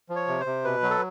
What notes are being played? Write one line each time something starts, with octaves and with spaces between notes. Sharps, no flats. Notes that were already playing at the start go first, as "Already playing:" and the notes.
F3
C#5
C3
C5
C3
B2 B4
F#3
A4